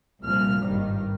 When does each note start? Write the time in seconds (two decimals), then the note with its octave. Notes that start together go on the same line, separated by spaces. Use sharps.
0.25 C2 A#2 F3 F6
0.63 G#1 G2 D#3 G3